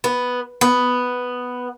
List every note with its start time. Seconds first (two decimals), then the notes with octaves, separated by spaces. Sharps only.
0.04 B3
0.61 B3